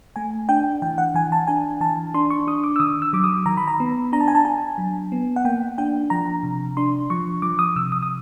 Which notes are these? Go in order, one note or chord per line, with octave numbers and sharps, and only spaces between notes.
A3 G#5
D4 G5
E3 G5
F#5
E3 G#5
A5
D4 G#5
E3 A5
D4 C6
C#6
D4 D#6
D6
E6
D#3 D#6
E6
F#3 D6
D#6
D#3 A#5
B5
A#5
B3
D4 A#5
A5
G#5
A5
D4 G#5
F#3
B3
F#5
A#3 G5
D4 G5
F3 A#5
C3
D4 C6
F3 C#6
F3 D6
D#6
C3 E6
D#6
D#6